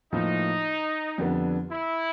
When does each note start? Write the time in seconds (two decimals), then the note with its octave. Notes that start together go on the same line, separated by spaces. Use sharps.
0.12 A2 F3 A#3 D#4
1.18 F2 D3 G3 B3 D4
1.71 E4